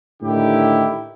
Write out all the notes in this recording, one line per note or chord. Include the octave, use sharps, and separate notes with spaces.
A2 D3 D#3 E4 G4